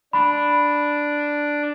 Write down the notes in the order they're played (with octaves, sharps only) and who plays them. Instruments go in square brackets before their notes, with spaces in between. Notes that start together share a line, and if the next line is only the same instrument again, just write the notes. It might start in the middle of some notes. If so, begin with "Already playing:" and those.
[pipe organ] D4 [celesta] B5